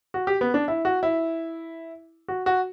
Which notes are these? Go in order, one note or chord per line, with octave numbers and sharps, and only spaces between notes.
F#4
G4
B3
D4
E4
F#4
E4
F#4
F#4